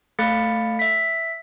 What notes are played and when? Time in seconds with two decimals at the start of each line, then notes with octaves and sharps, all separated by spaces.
0.19 A3 A4 F5 B5 A6 C#7
0.79 E5 B6